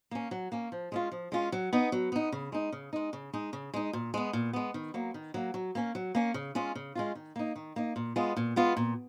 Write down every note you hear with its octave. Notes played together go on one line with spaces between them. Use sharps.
A#3 C#4
F#3
A#3 C#4
F3
G#3 C#4 F4
F3
G#3 C#4 F4
F#3
B3 D#4
F#3
B3 D#4
C#3
G#3 D#4
C#3
G#3 D#4
C#3
G#3 D#4
C#3
G#3 D#4
A#2
G#3 B3
A#2
G#3 B3
D#3
F#3 A#3
D#3
F#3 A#3
F#3
A#3 C#4
F#3
A#3 C#4
C#3
G#3 C#4 F4
C#3
G#3 C#4 F4
D#3
A#3 D#4
D#3
A#3 D#4
A#2
G#3 B3 F4
A#2
G#3 B3 F4
A#2